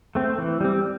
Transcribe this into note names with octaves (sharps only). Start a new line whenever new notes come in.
A3 C4
E3
G3 C4